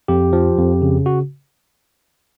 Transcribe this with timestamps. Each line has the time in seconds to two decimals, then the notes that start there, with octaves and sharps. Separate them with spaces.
0.08 F2 G4
0.33 F3
0.58 F2
0.82 C#3
1.06 F#4